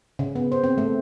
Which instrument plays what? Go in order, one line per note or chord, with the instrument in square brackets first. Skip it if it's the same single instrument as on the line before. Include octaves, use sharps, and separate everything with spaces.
[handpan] C#3
B3
C5
C4
A3